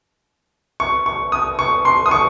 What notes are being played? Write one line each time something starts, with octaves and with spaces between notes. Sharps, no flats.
C#6
C#6
D#6
C#6
C6
D#6
C#6